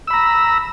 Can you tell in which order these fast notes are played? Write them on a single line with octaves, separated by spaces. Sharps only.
E6 B5 A#5